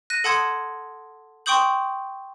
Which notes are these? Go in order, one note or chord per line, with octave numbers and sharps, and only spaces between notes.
F#6 A#6 D#7
A4 F#5 A5 C6 D#6 G#6
G5 C6 C#6 D#6 G6 F#7